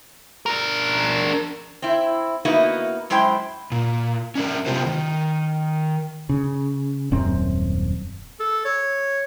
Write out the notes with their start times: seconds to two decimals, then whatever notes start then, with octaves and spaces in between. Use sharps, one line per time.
0.46 D4 A#4
1.82 C4 E4
2.45 A#3 B3 D#4 E4 F#4
3.10 F#2 G#3 E4 C5 G5
3.72 A#2
4.35 C#4 D4 A#4
4.66 C3 B3 F4 G4 C5
4.86 D#3
6.29 C#3
7.12 D#1 F#2 C4
8.39 A4
8.65 C#5